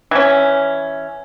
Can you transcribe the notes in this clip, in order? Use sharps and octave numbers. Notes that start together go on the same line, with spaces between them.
E3 C#4